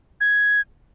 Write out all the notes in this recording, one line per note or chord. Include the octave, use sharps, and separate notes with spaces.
G#6